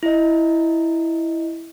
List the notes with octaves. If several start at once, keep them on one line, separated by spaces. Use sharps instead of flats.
E4 D#5